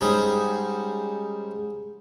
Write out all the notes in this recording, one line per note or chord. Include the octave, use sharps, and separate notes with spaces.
G#2 G3 C#4 G#4